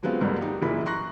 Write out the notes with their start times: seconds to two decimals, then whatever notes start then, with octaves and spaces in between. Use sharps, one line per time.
0.03 D3 F#3 G#3 B3 C4 F4
0.21 G1 C#2 G2 D3 G3 A#3
0.41 D#4 G4
0.62 F#1 A#2 E3 E4 B5
0.86 A#5 C6 C#6 F#6 A#6